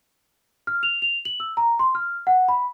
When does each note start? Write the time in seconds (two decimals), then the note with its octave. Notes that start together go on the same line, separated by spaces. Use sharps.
0.67 F6
0.83 F7
1.02 F7
1.25 F#7
1.40 E6
1.57 A#5
1.79 C6
1.95 F6
2.27 F#5
2.48 B5